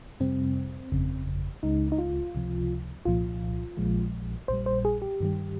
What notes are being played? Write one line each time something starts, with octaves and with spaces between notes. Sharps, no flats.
F2 C3 G3 C4
G1 F2 C#3
C#2 C#3 G#3 D#4
D#4
F4
C#2 C3 F3
C2 A#2 F3 F4
A#1 A#2 F3 G#3
A#1 A#2 G3 C5
C5
G#4
G4
G2 D#3 G3